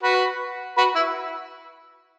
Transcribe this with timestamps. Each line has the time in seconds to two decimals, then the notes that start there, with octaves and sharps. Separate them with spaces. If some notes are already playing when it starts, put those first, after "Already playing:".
0.03 F#4 B4
0.78 F#4 B4
0.95 E4